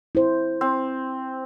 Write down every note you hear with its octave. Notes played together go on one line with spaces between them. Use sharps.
E4 C5
C4